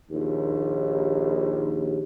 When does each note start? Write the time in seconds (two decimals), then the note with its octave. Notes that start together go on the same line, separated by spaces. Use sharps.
0.11 A#1 D#2